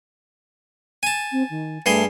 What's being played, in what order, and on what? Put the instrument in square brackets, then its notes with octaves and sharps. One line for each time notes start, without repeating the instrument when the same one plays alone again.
[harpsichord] G#5 A5
[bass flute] C4
D#3
[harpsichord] G2 G#4 C6 [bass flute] A3